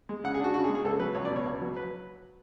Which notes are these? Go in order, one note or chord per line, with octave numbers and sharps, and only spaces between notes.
G#3
C#3 F#5
G#4
D4 F#4
C#3 F#4
G#4
G#3
G#4
C#2 A4
F#3 B4
C#2 C#5
D5
B2
C#5
C#2
F#3
B4